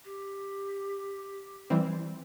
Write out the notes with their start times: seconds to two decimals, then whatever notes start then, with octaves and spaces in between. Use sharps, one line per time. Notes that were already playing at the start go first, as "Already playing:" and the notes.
0.05 G4
1.70 E3 G3 C4